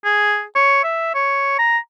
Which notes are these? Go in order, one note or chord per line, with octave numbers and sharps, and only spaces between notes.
G#4
C#5
E5
C#5
A#5